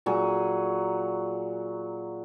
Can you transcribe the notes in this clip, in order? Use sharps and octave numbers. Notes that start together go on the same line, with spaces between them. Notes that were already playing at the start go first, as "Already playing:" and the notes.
A#2 F#3 G#4